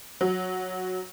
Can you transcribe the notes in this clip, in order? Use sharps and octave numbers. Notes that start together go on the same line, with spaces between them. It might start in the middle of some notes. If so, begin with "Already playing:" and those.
F#3